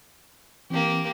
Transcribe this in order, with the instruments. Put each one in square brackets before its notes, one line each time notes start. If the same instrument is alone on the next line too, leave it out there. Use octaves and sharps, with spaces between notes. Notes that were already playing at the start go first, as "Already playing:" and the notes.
[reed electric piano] E3 C4 [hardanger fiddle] A#3 G4